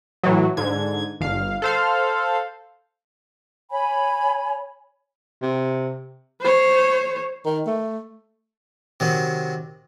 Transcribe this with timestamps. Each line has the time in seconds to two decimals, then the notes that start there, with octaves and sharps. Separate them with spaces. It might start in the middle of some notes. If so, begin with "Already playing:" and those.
0.23 A2 E3 F#3
0.57 G#2 D3 G#6
1.20 G1 F5
1.62 A4 C5 F5
3.70 C#5 G#5 B5
5.42 C3
6.40 C5 C#5
7.46 D#3
7.67 A3
9.00 C3 D#3 F#3